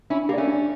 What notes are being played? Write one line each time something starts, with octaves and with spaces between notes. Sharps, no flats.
C#4 D4 E4
A3 A#3 C#4 G4 D5
D4